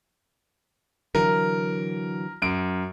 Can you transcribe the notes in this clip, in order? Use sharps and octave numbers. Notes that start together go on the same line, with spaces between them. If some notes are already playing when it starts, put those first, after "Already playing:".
D3 E3 F#3 A#4
F#2 D7